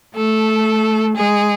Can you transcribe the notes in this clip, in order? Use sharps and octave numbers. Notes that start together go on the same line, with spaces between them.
A3 A4
G#3 G#4